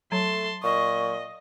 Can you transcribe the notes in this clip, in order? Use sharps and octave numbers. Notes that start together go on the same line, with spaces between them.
F#3 A3 A5 C6
A#2 D#5 C#6